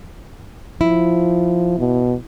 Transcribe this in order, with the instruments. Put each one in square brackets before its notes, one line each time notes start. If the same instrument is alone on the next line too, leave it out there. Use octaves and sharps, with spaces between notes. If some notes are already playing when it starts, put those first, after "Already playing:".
[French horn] F3 [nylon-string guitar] E4
[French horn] B2